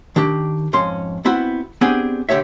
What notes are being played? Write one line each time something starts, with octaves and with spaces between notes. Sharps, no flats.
D#3 D4 G4
F2 G#2 C#4 C6
B3 C4 E4 F#4
B3 C4 D4 G4 G#4
C2 D3 G4 C#5 E5